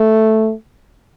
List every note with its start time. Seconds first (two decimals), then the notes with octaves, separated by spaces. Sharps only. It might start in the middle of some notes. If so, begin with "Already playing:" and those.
Already playing: A3